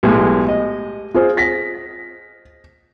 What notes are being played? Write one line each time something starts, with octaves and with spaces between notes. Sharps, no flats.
B1 A2 G#3 G4
D#5
F4 G#4 C5
A#6 B6